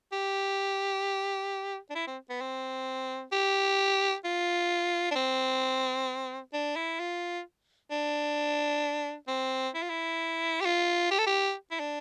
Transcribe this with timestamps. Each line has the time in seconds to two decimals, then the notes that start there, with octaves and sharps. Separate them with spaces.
0.12 G4
1.90 D4
1.95 E4
2.07 C4
2.30 B3
2.41 C4
3.32 G4
4.25 F4
5.11 D4
5.16 C4
6.53 D4
6.76 E4
7.00 F4
7.91 D4
9.28 C4
9.75 E4
9.82 F4
9.90 E4
10.61 G4
10.65 F4
11.11 G4
11.19 A4
11.27 G4
11.71 E4
11.80 D4